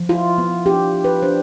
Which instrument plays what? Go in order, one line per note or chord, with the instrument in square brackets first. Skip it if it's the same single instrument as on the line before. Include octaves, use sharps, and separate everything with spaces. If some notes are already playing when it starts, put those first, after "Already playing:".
Already playing: [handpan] F3
E4 F4
B3
D4 G4
D4
B4
D4 C5